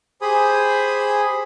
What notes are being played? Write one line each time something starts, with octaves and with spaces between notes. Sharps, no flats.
G4 G#4 C5 G#5 B5 D#6